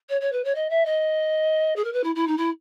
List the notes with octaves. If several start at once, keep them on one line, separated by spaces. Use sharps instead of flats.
C#5
C#5
B4
C#5
D#5
E5
D#5
G#4
A#4
B4
E4
E4
D#4
E4